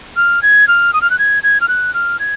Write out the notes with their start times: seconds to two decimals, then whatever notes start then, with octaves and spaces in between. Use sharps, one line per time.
0.16 F6
0.42 G#6
0.68 F6
0.93 D#6
1.02 F6
1.10 F#6
1.19 G#6
1.43 G#6
1.61 F6
1.68 F#6
1.94 F6
2.19 G#6